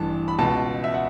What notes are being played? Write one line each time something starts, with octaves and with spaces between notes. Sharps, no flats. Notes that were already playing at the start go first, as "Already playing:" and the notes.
Already playing: A1 G2 E3 A5
B5
C#2 B2 A5
E5
F#5